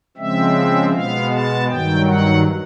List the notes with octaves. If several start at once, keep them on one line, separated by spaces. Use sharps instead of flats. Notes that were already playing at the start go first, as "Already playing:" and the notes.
C#3 F3 G#3 C4 E5
B2 G#3 B3 F5
A5
G2 D#3 F#3 G5
F#5